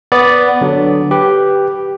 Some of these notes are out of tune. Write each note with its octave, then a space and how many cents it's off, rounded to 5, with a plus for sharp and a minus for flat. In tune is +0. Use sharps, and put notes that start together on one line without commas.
B3 +0 D5 -10
D3 +0 F#3 +0
G4 +0 B4 +0